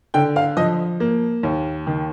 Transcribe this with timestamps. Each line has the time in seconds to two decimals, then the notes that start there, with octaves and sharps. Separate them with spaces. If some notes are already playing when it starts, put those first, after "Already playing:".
0.14 D3 G5
0.36 F5
0.57 F3 D#5
1.00 A#3
1.43 D#2
1.87 D#3